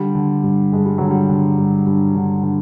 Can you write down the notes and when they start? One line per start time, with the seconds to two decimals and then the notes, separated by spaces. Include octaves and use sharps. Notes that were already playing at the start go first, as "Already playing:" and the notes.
Already playing: D3 G3
0.15 D3
0.43 G2
0.72 G2 G#3
0.85 G3
0.98 D3 F#3
1.10 G3
1.29 D3
1.58 G2
1.86 G2
2.15 D3
2.43 D3